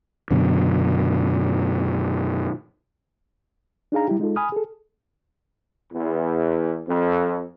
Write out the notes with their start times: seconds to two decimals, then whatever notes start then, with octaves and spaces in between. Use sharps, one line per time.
0.31 F#2 B2 D3
3.92 D4 D#4 G#4 F5 A#5
4.08 G3 E4 G4
4.20 G#3 D#4 F4 A4
4.36 G#5 B5 D#6 F6
4.52 G#4 A4
5.93 E2
6.87 F2